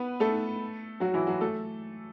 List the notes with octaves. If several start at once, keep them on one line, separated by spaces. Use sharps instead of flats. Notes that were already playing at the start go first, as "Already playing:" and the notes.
Already playing: B3 B4
A3 A4
F#3 F#4
E3 E4
F#3 F#4
A3 A4